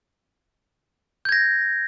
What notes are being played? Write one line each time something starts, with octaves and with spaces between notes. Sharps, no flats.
G6 G#6 A#6